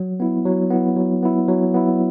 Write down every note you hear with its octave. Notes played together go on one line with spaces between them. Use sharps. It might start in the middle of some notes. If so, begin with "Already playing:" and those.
Already playing: F#3
B3 E4
F#3
B3 E4
F#3
B3 E4
F#3
B3 E4